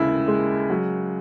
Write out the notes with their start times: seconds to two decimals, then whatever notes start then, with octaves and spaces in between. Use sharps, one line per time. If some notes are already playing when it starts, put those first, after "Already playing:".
Already playing: D#2 C#3 G#3 E4
0.28 G#3
0.70 F#3